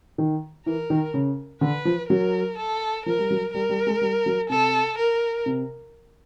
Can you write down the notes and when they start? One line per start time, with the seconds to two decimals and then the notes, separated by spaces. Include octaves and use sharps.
0.18 D#3
0.66 E3 A#4
0.90 D#3
1.14 C#3
1.61 D3 B4
1.85 F3
2.09 F#3 A#4
2.58 A4
3.06 F3 A#4
3.19 G3
3.31 F#3
3.54 G3 A#4
3.69 G3
3.87 G#3
4.01 G3
4.26 F#3
4.49 C3 A4
4.98 A#4
5.46 C3